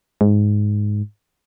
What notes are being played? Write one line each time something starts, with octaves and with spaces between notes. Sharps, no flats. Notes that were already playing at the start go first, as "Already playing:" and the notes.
G#2